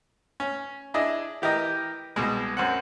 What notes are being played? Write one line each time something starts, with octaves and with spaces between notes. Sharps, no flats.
C#4
D4 E4 G#4 D#5
E3 G4 A#4 D#5
C2 B2 G#3
F#2 C4 F#5